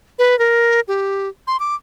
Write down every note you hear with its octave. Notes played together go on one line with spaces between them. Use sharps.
B4
A#4
G4
C6
D6